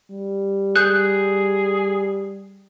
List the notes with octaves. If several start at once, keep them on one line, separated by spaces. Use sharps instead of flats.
G3
G#4 F#6 G6